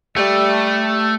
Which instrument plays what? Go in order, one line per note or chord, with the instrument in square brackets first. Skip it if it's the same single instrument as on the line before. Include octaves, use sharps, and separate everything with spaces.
[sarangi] G3 [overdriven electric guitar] A3